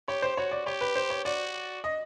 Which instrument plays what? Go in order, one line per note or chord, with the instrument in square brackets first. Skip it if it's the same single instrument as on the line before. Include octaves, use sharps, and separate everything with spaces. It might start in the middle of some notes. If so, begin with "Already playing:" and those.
[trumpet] G4 [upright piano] C#5
[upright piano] C5
[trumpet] F#4 [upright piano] C#5
[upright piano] D5
[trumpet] G4 [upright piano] C#5
[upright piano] B4
C5
C#5
[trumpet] F#4 [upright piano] D5
[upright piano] D#5